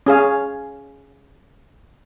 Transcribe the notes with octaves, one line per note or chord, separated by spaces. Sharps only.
C#4 G#4 F5